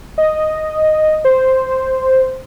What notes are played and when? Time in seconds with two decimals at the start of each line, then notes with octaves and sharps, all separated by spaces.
0.18 D#5
1.25 C5